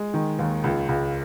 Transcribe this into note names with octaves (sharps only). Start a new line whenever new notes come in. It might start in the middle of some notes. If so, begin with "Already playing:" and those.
Already playing: G#3
D#3
D#2
C#2
C#2